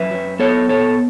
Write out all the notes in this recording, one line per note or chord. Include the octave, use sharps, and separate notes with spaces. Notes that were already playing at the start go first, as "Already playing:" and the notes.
Already playing: F#2 B4 E5
F#3
B3 A4 C#5
B2 A4 C#5